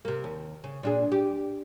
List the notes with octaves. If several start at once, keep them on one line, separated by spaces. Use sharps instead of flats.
C3 A#3
D#2
C#3
A#2 D4 G#4
G4